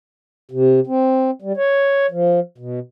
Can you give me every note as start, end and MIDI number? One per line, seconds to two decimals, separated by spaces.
0.51 0.80 48
0.87 1.31 60
1.42 1.53 55
1.57 2.06 73
2.11 2.40 53
2.58 2.79 47